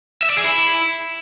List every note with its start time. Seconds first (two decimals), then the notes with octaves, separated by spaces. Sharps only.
0.23 E5
0.30 D5
0.37 G#4
0.44 E4